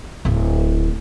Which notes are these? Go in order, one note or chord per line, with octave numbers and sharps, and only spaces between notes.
D1 E4